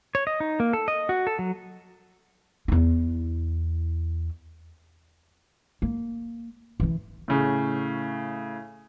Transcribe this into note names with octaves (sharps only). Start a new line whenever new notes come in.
C#5
D#5
D#4
A#3
A4
D#5
F#4
A4
F#3
E2 E4
A#3
E3 E4
A2 C#3